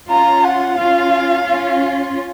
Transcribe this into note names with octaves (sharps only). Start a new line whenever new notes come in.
C#4 F4 A#5
F#5
C#4 F4 F5
C#4 F4